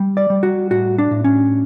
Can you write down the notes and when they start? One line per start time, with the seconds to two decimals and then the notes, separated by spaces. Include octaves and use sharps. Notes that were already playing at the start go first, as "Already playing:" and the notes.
Already playing: G3
0.17 D5
0.30 G3
0.43 F#4
0.70 A2 F#4
0.98 D4
1.11 A2
1.24 C#4